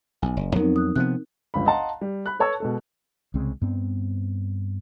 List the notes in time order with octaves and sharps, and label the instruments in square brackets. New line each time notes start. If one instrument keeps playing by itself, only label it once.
[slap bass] B1 [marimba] G#5
[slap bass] F#1
[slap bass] F2 F#3 B3 [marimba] C4 D#4 A#4
[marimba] D#6 F#6
[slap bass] C3 F3 B3 [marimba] F#6
[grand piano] G1 C#2 B5
D#5 F5 F#5 A5 A#5 C6
G3
B5 F#6
A4 B4 C#5 A5 C#6 E6
B2 G#3 A4
[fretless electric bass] C2 C#3 G#3 C4
G2 B3 C4